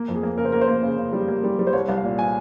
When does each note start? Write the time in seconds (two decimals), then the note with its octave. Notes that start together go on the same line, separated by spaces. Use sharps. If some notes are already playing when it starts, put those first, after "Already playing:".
Already playing: A#3
0.08 F2
0.15 G#4
0.23 A#3
0.38 C#3 A#4
0.45 C5
0.52 A#3 A#4
0.61 C5
0.68 A#3
0.83 C#3
0.98 C#3
1.13 G3
1.28 A#3
1.44 G3
1.59 G3
1.67 C5
1.73 C2 C#5
1.89 C2
1.97 F5
2.04 A#2
2.19 G#5